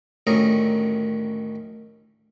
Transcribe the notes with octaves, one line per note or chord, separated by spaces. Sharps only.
A1 D2 D#3 C#4 D#5 A#5